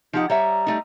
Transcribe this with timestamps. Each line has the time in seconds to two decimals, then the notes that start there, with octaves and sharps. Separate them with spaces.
0.13 F3 D#4 G4 F#5
0.30 G3 C#5 E5 A#5
0.67 G3 A3 D#4